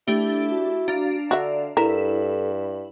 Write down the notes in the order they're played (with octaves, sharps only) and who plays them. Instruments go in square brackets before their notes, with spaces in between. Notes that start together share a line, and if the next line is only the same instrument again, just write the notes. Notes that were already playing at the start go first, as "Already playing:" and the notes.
[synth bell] A3 D4 G4 [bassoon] E4
[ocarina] F#4
[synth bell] D4 F5 A#5
[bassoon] D3 [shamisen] F#4 E5 [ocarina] D5
[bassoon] G2 [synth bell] E4 [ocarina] A4 [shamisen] A#4